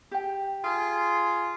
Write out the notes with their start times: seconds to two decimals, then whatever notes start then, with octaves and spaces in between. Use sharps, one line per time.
0.11 G4 G5
0.64 F4 G#4